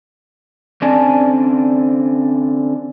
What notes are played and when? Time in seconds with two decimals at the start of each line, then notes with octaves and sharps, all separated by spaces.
0.82 D3 C4 C#4 D5 G#5 A5